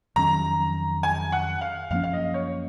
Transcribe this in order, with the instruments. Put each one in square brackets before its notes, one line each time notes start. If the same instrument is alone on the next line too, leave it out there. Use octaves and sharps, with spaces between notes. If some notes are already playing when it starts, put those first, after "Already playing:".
[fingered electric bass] F2 D#3 F#3 C#4 [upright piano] A#5
[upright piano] G#5
F#5
F5
[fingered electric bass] F#2 F3 A#3 C#4 [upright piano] F5
[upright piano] F5
D#5
C#5